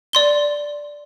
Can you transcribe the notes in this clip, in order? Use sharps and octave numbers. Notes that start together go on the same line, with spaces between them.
D5 C6 G7